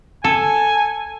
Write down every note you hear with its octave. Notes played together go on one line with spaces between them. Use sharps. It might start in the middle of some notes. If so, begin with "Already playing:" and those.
A4 G#5